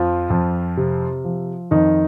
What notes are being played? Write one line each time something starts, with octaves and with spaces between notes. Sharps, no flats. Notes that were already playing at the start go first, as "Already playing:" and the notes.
Already playing: F2 F3 F4
F2
C3
F3
F2 D#3 D#4